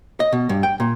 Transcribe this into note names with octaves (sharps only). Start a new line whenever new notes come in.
D#5
B2
G2
G5
A#2